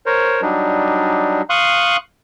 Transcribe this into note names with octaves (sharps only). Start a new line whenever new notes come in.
A#4 C5 C#5
F#3 G3 D4 D#4
F5 C6 C#6 D#6 F#6